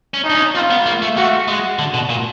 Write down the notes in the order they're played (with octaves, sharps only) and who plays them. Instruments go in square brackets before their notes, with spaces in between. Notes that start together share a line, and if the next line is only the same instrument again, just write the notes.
[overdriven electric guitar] C#4
[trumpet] D#4
[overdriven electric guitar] D4
C#4
[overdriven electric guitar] C4 [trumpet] F4
[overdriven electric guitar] B3
A#3
A3
[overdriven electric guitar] A3 [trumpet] F#4
[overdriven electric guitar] G#3
D3
B2
A#2